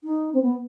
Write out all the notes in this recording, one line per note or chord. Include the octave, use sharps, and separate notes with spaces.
D#4
C4
B3